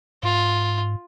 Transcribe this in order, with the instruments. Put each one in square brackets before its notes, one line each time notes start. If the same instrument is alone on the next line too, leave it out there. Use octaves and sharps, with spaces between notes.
[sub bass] G#2 [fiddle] F4